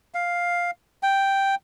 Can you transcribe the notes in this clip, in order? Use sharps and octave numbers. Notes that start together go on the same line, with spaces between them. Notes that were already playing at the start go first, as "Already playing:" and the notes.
F5
G5